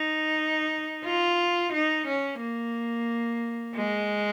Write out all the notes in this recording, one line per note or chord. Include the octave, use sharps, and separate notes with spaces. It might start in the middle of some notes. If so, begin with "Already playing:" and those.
Already playing: D#4
F4
D#4
C#4
A#3
G#3